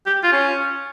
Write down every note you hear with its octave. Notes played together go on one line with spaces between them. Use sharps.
G4
F4
C#4